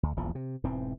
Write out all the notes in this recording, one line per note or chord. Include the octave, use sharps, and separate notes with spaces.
D2
D#1 A#1 E2 F3
C3
E1 G#2 E3 C4